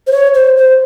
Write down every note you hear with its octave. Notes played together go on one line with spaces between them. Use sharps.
C5
C#5
C5
C5